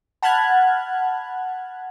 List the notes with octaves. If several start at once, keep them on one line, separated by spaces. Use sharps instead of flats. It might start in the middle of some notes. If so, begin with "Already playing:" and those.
F#5 A5 B5 F6 F#6 G#6